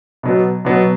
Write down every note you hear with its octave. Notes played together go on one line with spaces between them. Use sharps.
B2 F#3 B3
B2 F#3 B3